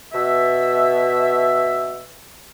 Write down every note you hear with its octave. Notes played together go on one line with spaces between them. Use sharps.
B2 E5